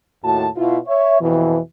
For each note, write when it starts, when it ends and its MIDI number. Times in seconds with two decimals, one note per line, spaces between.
0.23 0.47 39
0.23 0.47 45
0.23 0.47 66
0.23 0.47 81
0.56 0.77 47
0.56 0.77 64
0.56 0.77 65
0.87 1.17 73
0.87 1.17 76
1.21 1.58 41
1.21 1.58 47
1.21 1.58 52